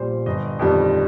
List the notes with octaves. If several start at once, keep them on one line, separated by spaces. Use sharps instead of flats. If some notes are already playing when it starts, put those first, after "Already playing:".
Already playing: A#1 A#2 G3 C5
G1 D#5
F2 D#3 G3